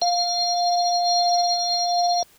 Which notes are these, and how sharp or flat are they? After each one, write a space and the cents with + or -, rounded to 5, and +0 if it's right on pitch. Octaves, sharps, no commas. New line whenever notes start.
F5 +10